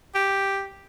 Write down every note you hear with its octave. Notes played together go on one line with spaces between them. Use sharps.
G4